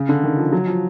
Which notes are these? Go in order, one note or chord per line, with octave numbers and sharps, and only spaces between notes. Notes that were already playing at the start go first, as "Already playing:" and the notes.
Already playing: C#3
D3
D#3
F3
F#3
F3